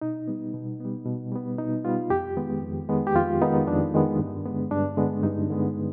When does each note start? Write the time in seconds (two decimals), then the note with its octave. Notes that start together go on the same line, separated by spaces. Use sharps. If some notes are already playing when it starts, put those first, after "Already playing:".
0.01 B2 D#4
0.28 G3 B3
0.54 B2
0.80 G3 B3
1.06 B2
1.32 G3 B3
1.58 B2 D#4
1.85 G3 B3 F4
2.10 F2 G4
2.37 D#3 G#3 B3
2.62 F2
2.89 D#3 G#3 B3
3.07 G4
3.15 F2 F4
3.42 D#3 G#3 B3 D#4
3.67 F2 D4
3.94 D#3 G#3 B3
4.20 G2
4.45 D3 G#3 B3
4.71 G2 D4
4.97 D3 G#3 B3
5.23 G2 D#4
5.50 D3 G#3 B3